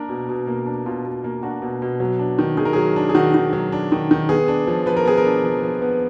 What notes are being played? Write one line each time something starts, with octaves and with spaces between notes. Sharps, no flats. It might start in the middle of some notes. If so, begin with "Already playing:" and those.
Already playing: A#3 D4 A#4
B2
B2
A#3
D4
B2 F4
B2
A#3
D4 F#4
B2
B2
F#3
D4
D#3
D#3 G#4
A#4
F#3 G#4
D4
G#4
D#3 F#4
D#3
F#3
D4
D#3
D#3
B3 G#4
D4
F3
F3 B4
A#4
B3 G#4
A#4
D4
F3
F3
B3